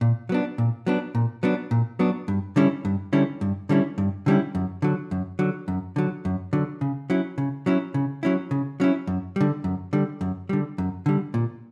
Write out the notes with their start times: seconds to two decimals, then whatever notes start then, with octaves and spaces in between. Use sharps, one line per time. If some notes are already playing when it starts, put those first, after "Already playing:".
0.01 A#2
0.29 F#3 B3 D4
0.58 A#2
0.86 F#3 B3 D4
1.15 A#2
1.43 F#3 B3 D4
1.71 A#2
1.99 F#3 B3 D4
2.28 G2
2.56 D3 G3 C#4 E4
2.85 G2
3.13 D3 G3 C#4 E4
3.41 G2
3.69 D3 G3 C#4 E4
3.98 G2
4.26 D3 G3 C#4 E4
4.55 F#2
4.82 D3 F#3
5.11 F#2
5.39 D3 F#3
5.68 F#2
5.96 D3 F#3
6.25 F#2
6.53 D3 F#3
6.81 C#3
7.10 F#3 C#4 E4
7.38 C#3
7.66 F#3 C#4 E4
7.94 C#3
8.23 F#3 C#4 E4
8.51 C#3
8.80 F#3 C#4 E4
9.07 F#2
9.36 D3 G3
9.64 F#2
9.93 D3 G3
10.21 F#2
10.49 D3 G3
10.78 F#2
11.06 D3 G3
11.34 A#2